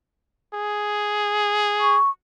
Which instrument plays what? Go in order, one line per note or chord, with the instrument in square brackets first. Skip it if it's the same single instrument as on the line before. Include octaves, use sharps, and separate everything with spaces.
[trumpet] G#4
[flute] C#6